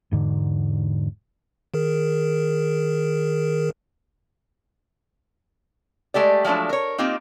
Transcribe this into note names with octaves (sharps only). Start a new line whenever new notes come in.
E1 G#2 D3
D#3 G#4 A#4
G#3 A3 G4 D5
F3 F#3 G#3 A3 D4
A#4 C#5
A#3 C4 D#4 F4 G4